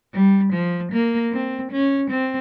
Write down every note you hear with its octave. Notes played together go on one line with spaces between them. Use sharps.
G3
F3
A#3
C4
C#4
C4